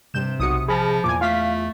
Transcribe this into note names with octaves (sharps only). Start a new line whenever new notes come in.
G2 C3 G6 E7
B1 F#4 D#6 C#7
F3 G#4 A5 B5 F6 A#6
E2 A#2 G#5 D6
A3 F4 F5 B6